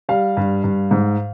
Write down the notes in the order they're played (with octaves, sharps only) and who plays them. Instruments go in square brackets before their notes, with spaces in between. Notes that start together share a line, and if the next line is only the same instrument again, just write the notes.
[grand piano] G3 F5
G2
G2
G#2